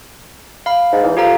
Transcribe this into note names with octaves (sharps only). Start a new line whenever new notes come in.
F5 B5
G#2
E2
F3 G4 A4 A#5